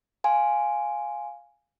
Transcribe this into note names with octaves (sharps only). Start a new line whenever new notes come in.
F5 G#5 C6